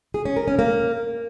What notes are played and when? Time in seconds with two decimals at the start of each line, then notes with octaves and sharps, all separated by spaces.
0.14 G#4
0.25 C#4
0.37 A#4
0.48 C#4
0.59 A#3